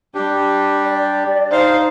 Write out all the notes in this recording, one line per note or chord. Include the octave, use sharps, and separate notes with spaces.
G3 D4 G4
D5
D#4 C5 F5